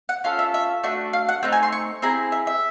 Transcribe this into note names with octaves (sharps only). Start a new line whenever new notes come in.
F#5
C#4 F4 A4 F5
E5
E5
A3 D4 F#4 E5
F5
F#5
A3 C4 D#4 G5
G#5
C6
C#6
C4 E4 G#4 A#5
E5
E5